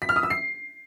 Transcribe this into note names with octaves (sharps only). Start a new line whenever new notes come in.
B6
F6
D#6
E6
C7